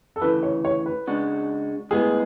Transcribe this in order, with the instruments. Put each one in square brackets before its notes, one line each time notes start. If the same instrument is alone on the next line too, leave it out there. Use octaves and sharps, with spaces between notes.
[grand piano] A4
[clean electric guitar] D2 C#3 E3 [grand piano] B4
[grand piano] C#5
C#5
B4
[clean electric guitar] C#3 G#3 D4 F#4
[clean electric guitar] A2 G#3 B3 [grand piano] G#4